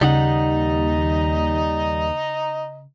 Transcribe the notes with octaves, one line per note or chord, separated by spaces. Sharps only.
D#2 C#3 G3 D#4 D#5 F#5 A#5